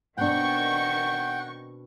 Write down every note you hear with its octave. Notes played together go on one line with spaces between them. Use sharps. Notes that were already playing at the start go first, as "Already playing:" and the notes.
B2 D#3 C4 D4 F#5 G5 C#6